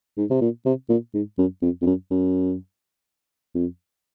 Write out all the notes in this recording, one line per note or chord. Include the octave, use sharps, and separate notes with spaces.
G#2
C3
A#2
C3
A#2
G#2
F#2
F2
F2
F#2
F#2
F2